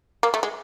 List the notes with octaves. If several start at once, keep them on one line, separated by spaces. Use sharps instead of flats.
A#3
A3
G#3